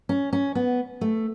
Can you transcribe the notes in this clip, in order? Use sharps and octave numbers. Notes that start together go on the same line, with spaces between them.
C#4
C#4
B3
A3